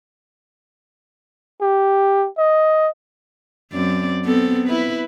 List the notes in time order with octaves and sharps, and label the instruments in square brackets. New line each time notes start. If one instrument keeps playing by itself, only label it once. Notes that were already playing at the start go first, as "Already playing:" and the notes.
[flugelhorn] G4
D#5
[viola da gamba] F#2 C4 D5
B3 C4 A4
E4 B4